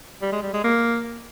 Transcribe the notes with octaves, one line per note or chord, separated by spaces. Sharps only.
G3
G#3
G3
G#3
A#3